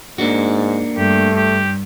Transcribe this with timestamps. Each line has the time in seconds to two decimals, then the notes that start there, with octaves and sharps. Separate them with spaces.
0.18 G#2 A#3 D4 F#4
0.97 G2 A3 G4
1.37 G4